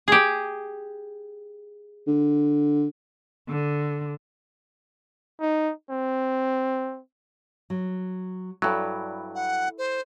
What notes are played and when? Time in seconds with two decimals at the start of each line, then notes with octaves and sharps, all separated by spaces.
0.08 G4 G#4
2.07 D3
3.48 D3
5.41 D#4
5.90 C4
7.70 F#3
8.62 G2 F#3 E4 A4 D5
9.35 F#5
9.78 C5